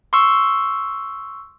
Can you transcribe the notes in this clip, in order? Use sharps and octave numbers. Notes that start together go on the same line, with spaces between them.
C6 C#6 E6